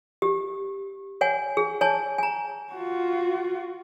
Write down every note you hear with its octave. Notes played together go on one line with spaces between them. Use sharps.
G4
C#5 F#5 G#5
G#4
C#5 G#5 A5
G#5 A#5
F4 F#4